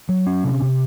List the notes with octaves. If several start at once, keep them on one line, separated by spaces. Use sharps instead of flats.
F#3
C#4
C3
C3